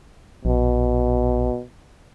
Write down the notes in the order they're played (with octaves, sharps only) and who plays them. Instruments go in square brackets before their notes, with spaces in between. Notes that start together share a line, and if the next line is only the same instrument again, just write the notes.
[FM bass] A#1 [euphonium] B2